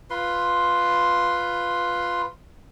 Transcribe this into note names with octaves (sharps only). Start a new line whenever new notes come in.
F4 B4 C6